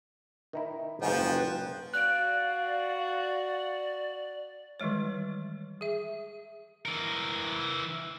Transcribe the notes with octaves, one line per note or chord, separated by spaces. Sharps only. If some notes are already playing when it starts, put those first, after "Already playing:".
D#3 D#4 E4
F#1 G#2 C#3 F3 B4 F5 G5
F#4 D5 F5 F#6 D7
D#3 E3 G3 G#3 C#5
G#4 E5
E3 A#4